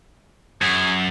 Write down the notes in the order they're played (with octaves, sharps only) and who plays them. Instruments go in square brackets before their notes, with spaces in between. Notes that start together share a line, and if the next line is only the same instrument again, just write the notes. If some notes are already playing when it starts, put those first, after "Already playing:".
[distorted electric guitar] F#2 [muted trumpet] G#4